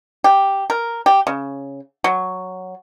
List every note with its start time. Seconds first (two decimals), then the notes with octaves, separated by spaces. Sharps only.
0.24 G4
0.70 A#4
1.06 G4
1.27 C#3
2.04 F#3